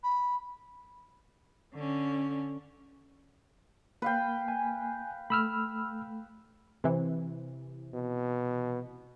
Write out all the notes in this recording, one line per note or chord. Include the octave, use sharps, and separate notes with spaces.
B5
D3 C#4
A#3 B4 F5 G5
G#5
A3 B5 E6 F6
C3 E3
B2